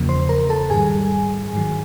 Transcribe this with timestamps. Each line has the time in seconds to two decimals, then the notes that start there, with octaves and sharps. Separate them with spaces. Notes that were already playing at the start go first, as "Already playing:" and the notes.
Already playing: E2 C#3 F3 A#3
0.09 C5 C6
0.29 A#4 A#5
0.49 A4 A5
0.70 G#2 D#3 G3 G#4 G#5
1.53 G#2 D#3 F#3